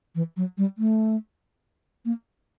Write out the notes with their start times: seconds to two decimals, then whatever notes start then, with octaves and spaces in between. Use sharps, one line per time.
0.15 E3
0.37 F#3
0.58 G3
0.78 A3
2.05 A#3